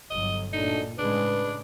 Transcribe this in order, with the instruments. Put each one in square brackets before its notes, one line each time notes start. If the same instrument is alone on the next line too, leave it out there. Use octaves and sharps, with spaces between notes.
[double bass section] G1 F#3 [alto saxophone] D#5
[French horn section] F#2 A3 D4 [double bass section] A#2 [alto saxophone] D#4
[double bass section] A2 C#3 G#3 [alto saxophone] D4 [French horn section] B4